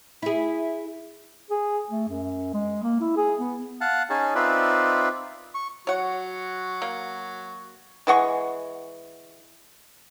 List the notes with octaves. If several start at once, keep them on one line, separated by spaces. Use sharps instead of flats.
E4 G#4
G#4
A3
F#2
G#3
A#3
E4
G#4
B3
F5 F#5 A5
C#4 D#4 G#4 A5
C4 D#4 F4 B4 D5 E5
C#6
F#3 F#4 C#5 F#5
A#3
E3 G#3 F#5 C#6